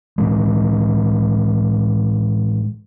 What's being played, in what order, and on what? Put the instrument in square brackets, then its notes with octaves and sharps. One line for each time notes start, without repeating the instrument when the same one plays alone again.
[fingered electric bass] A2 E3 G#3